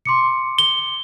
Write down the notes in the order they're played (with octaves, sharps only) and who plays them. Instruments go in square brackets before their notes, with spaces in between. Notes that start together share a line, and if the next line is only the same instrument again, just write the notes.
[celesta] C6 D6 C#7
[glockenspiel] G7